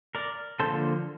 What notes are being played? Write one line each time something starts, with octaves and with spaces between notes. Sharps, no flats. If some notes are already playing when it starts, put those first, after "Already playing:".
A#4 D5
D3 F3 A#3 A4 C5